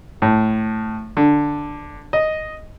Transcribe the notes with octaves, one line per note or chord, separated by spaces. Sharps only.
A2
D3
D#5